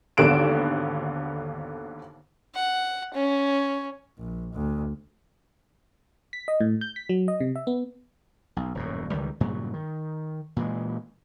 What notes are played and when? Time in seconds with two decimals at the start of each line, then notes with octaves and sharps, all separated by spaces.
0.17 G#1 D#2 D3 B3 D7 E7
2.55 F#5
3.14 C#4
4.18 A#1
4.54 D2
6.33 B6
6.48 D#5
6.61 A2
6.81 G6
6.96 B6
7.09 F#3
7.28 D#5
7.40 C3
7.56 E5
7.67 B3
8.56 B1
8.74 D#1 F#2 A2
9.10 C#2 D#3 E3 G3
9.40 G2 A#2 C#3 F#3
9.74 D#3
10.56 A#2 E3 G#3